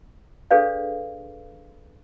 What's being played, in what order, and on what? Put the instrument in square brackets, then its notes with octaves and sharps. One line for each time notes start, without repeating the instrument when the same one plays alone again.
[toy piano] D4 G#4 A4 B4 D5 F5